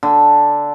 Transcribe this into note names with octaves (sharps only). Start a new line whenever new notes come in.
D3